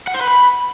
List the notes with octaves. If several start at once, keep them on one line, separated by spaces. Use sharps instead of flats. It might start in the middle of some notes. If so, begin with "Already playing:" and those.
F#5
C5
B4
B5